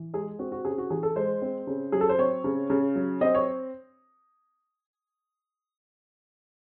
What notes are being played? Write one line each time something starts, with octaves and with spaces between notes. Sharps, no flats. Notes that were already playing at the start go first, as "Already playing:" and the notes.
Already playing: E3
G#3 G#4
C4 F#4
F#4
C#3 G#4
F#4
E3 G#4
A4
G#3 C5
C4
C#3
F#3 G#4
A4
C5
C4 C#5
C#3
C#3
F#3
C4 D#5
C#5